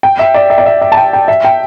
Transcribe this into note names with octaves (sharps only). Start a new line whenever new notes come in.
G5
E5
D5
E5
D5
E5
E5
A5
G5
G5
E5
G5